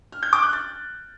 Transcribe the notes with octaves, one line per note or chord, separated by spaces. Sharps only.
F6
G6
D6
F#6
A6